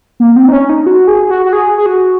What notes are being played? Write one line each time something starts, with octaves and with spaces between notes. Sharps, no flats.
A#3
C4
D#4
C#4
D#4
F#4
G#4
F#4
F#4
G#4
G#4
F#4